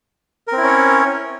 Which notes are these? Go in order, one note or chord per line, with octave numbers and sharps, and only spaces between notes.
C4 C#4 E4 A#4 C#5